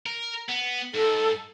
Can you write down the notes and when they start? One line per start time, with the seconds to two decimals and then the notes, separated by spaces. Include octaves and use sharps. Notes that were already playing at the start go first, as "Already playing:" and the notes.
0.06 A#4
0.49 B3
0.94 G#2 A4